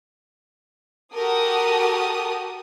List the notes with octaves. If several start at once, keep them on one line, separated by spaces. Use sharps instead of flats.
F#4 G4 A4 A#4 D#6